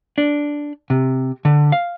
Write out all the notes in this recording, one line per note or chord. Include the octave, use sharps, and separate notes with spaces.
D4
C3
D3
F5